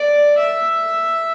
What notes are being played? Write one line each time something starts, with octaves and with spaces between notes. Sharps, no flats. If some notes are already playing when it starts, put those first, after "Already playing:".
Already playing: D5
E5